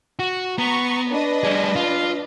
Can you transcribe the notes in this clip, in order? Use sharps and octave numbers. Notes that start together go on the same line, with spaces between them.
F#4
B3 A#5 C#6
D4 B4 D#5
G3 G#4
F4